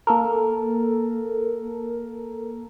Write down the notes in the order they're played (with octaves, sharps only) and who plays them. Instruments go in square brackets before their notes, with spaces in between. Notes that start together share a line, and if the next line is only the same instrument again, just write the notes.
[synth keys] A#3 A4 A#4